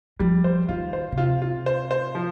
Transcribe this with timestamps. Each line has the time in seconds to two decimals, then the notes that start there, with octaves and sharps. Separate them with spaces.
0.19 F3 G3
0.44 C5
0.69 D#3 F4
0.93 C5
1.12 C#3
1.18 C3 F4
1.42 F4
1.66 C5
1.91 C5
2.15 F3